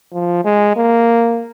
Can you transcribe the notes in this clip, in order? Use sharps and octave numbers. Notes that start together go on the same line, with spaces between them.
F3
G#3
A#3